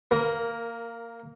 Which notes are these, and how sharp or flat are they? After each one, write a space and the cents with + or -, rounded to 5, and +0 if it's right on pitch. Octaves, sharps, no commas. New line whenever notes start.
A#3 -15 A#4 +5